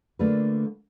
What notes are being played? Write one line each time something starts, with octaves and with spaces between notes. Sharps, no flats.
D3 A3 A#3 D4 F4 B4